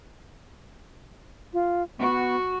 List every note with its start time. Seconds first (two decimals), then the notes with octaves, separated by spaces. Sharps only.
1.53 F4
1.99 B3 F#4